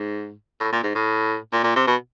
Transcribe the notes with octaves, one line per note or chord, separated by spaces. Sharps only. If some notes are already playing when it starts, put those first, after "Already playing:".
Already playing: G#2
A2
A#2
G#2
A2
A#2
A#2
C3
B2